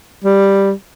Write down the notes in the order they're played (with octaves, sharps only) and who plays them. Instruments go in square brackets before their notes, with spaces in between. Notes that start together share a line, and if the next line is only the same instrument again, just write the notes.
[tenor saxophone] G3